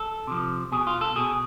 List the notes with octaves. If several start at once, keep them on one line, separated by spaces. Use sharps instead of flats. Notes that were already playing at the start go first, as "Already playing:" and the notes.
Already playing: A4
C3 F3
B2 G#4
F4
A4
B2 G#4